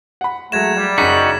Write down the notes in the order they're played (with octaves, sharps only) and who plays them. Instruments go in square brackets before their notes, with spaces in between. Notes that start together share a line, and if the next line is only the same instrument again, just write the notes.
[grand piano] F#5 B5
[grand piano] F#3 G#3 [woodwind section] A3 F#5 A#5 [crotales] G#6 E7
[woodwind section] G3
[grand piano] F#1 C#4 G#4 [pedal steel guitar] D#4 F#4 [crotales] B6